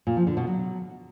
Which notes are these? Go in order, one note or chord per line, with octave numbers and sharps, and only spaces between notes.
A#2
F3
D3
B2
F#3